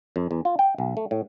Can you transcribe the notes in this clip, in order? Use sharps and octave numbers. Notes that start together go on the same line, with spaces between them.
F2
E2
F4
G5
B1
A3
A2